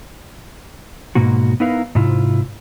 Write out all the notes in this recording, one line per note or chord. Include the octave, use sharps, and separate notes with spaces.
G#2 B2 A#3 F#4
B3 D#4 E4 A#4 B4 F5
G#2 C3 E4 F4